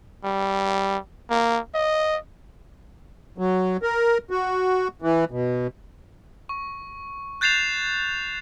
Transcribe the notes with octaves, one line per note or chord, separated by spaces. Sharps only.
G3
A#3
D#5
F#3
A#4
F#4
E3
B2
C#6
F#6 G6 A6 C7 E7 F7